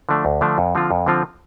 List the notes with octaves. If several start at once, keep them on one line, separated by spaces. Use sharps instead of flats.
D3 F3 A3 D4
D2
D3 F3 A3 D4
F2
D3 F3 C4 F4
F2
D3 F3 C4 F4